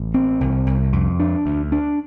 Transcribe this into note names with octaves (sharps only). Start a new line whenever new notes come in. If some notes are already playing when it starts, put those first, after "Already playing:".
Already playing: A1
C4
C2
C2
F2
D4
D2
D4